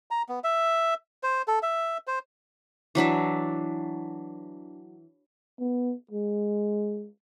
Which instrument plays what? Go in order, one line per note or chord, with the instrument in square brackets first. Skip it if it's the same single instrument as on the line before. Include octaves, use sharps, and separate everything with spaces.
[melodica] A#5
B3
E5
C5
A4
E5
C5
[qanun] E3 F#3 D4 E5
[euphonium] B3
G#3